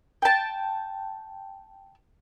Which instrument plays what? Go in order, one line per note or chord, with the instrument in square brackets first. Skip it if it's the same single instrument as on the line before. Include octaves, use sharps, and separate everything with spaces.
[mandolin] G5 A5